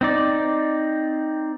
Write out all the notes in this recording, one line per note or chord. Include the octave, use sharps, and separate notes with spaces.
C4 D#4 D5